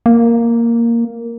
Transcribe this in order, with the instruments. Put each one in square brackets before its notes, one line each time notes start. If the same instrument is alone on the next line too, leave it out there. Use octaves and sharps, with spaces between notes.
[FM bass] A#3